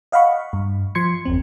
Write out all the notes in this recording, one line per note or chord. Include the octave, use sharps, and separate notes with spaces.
D#5 F5 F#5 B5 C#6
G2
F3 C6 G#6 C#7
G1 E2 C4